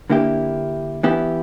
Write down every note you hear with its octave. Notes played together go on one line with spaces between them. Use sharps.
D3 A#3 E4 G4
E3 B3 E4 G4